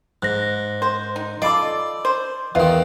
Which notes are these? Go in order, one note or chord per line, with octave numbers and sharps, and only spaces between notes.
G#2 F#6 A#6
C5
D#4
F4 A4 D5 D#5 B5 D6
C5
E2 D#3 F4 E5 F5